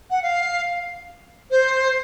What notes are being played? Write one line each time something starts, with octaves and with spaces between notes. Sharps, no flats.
F#5
F5
C5